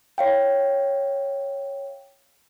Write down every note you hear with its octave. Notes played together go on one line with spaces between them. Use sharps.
C#5 F5 G5